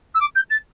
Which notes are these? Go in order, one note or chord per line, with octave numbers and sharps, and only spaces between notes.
E6
D6
G6
A6